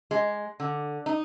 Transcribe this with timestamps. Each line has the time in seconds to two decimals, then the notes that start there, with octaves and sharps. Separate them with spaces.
0.11 G#3
0.60 D3
1.06 D#4